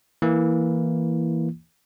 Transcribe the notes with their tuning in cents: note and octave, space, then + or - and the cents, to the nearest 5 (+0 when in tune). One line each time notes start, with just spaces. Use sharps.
E3 +0 A#3 +0 E4 -5